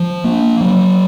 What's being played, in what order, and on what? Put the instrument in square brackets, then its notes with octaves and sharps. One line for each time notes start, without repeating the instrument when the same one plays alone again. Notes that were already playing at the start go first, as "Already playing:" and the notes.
Already playing: [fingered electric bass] F3
A#3
F#3